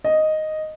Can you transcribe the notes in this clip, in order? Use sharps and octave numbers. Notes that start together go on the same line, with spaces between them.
D#5